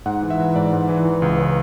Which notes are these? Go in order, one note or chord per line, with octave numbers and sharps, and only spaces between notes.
G#2 F#5
E3
E5
E3
G#2 D5
G#2
E3
E3
C#2
C#3